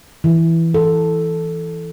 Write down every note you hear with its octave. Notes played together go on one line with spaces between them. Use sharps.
E3
A4